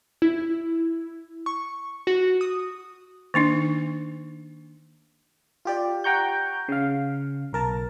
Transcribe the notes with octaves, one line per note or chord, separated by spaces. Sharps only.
E4
C#6
F#4
D#6
D#3 A#3 D4 D#4
F4 G4 D5
F#5 G5 A#5 C#6 G6
C#3 F5
B1 A#4 A5